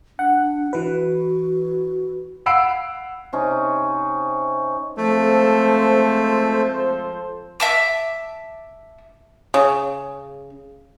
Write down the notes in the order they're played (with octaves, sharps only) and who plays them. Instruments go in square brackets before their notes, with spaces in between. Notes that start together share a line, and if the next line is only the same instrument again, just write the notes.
[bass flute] D4 [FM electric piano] F#5
[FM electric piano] E3 B4 [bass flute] F#4
[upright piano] F5 F#5 B5 E6 C7 D7
[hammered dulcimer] C3 C#4 D#4
[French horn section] F2 G#3 C4 [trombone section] F3 A4 C5 [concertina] A3
[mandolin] E5 A5 D6
[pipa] C#3